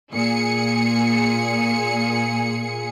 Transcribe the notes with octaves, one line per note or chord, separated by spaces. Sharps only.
A#2 G#4 C#7